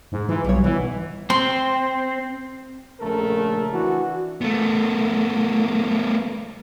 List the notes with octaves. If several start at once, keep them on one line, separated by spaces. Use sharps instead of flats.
G#2
E3 F4
B1 G3 C#5
B2 E3
C4 C6
A#1 C#3 A3 A4 A#4
E3 D4 F#4
A3 B3